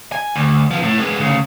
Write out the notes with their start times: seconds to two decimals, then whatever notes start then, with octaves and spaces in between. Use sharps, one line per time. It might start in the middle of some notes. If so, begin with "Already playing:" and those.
0.12 G#5
0.36 D2
0.71 F3 B3
0.83 A2
0.98 G#3 B3
1.20 D2 C#3